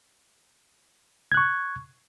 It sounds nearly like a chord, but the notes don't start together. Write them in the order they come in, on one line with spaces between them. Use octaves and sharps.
G#6 F#6 C#6